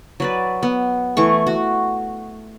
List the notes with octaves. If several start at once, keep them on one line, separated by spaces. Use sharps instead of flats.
F#3 B4 D5
B3
E3 A3 C#6
F#4